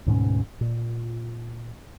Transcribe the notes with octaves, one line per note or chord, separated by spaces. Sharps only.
D2 G#2 B2 C#4
A#2